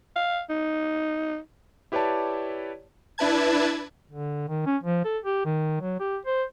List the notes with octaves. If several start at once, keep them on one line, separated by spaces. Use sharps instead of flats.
F5
D#4
E4 G4 B4 C#5 D5 A5
D4 E4 B4 A5 G#6
D3
D#3
C#4
F3
A4
G4
D#3
F#3
G4
C5